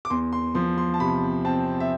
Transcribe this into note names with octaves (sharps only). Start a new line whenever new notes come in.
D6
E2 C6
C6
F3 C6
C6
A5
C3 B5
C4 A5
E5